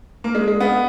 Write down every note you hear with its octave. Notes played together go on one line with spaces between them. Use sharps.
A#3
G#3
G#3
B3